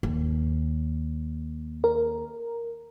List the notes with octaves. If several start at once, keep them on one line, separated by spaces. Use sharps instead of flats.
D#2
A#4